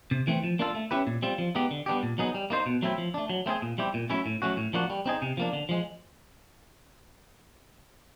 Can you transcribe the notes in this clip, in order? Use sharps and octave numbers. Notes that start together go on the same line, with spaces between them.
C3
E3 A3 C4
F3
A#3 D4 F4 A4
A3
C#4 E4 G4 B4
A#2
G3 C4 F4
F3
G#3 B3 D#4 G4
D3
G3 B3 D4 G4
A#2
F#3 B3 D#4 G#4
G3
A#3 D#4 G#4 C5
B2
F#3 A3 C4 E4
F3
A3 D4
F#3
A3 C4 E4 G#4
A#2
G3 C4 E4 G4
A#2
F#3 A3 C#4 E4
A2
F#3 A3 C#4 F#4
A2
F3 A#3 D4 F#4
G3
C4 D#4 G#4
C3
F3 A#3 D4
D3
F3 G#3